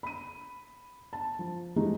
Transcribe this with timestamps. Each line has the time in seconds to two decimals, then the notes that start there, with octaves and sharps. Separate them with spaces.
0.03 B5 D#7
1.13 A5
1.39 F3
1.76 E3 F3 G#3 A3 D#4 G4